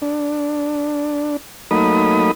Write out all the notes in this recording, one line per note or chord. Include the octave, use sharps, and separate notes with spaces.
D4
F#3 A3 A#3 D#4 B5 D#6